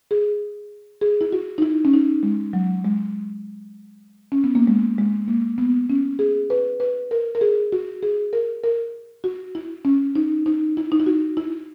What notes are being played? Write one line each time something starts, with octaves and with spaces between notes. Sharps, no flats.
G#4
G#4
E4
F#4
D#4
E4
C#4
D#4
G#3
F#3
G#3
C#4
B3
A#3
G#3
G#3
A#3
B3
C#4
G#4
B4
B4
A#4
A#4
G#4
F#4
G#4
A#4
A#4
F#4
E4
C#4
D#4
D#4
E4
D#4
E4
F#4
E4